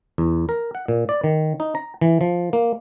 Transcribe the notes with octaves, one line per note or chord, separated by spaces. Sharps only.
E2
A#4
F#5
A#2
D5
D#3
D#4
A#5
E3
F3
A#3